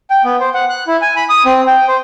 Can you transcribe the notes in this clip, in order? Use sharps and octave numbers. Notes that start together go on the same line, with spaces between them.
G5
B3
C5
F#5
F#6
E4
G#5
B5
D#6
C4
G5
C5